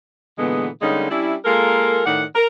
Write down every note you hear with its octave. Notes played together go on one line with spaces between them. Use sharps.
A#2 D3 E3 G#3 B3
D3 G3 G#3 A#3 C#4 D#4
G3 C#4 D4 E4
G#3 A#3 F4 A4 A#4
A2 D#3 D5 F#5
A#4